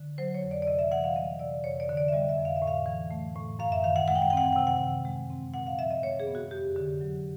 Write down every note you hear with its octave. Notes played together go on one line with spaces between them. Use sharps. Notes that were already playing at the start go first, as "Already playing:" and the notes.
Already playing: D3
F#3 C5
C#5
F2
D5
D5
C3 D#5
E5
E3 F#5
F5
G3 D#5
C3 D5
F2 C#5
D5
D3
D5
E5
G3 D#5
E5
F2
F5
E5
A2
F5
E3
A3
A2
F#2 F5
E5
D#3 F5
F#5
G#3 F#5
G5
F#5
G5
C4 F#5
G5
F#5
C3 G5
F#5
D#3
G#3
C4
A#2 F#5
F5
F3 E5
D#5
G#3 C#5
G#4
B3
F#4
F2 G4
D3
F#3